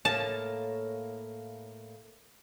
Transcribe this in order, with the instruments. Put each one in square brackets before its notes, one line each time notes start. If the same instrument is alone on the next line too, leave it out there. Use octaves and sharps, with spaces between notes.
[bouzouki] A2 A#3 C#5 [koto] A5